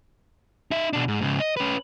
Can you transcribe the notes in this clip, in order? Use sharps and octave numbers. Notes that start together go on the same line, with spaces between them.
D#4 E5
B2 D4
G#2
G#2 C#3
D#5
C#4 B4